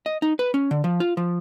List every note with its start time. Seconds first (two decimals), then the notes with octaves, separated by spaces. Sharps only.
0.06 D#5
0.22 D#4
0.39 B4
0.54 C#4
0.71 D3
0.84 F3
1.00 F4
1.17 F3